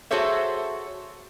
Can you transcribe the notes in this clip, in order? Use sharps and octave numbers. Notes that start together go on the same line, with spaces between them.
F#4 G#4 A4 C5 C#5 E5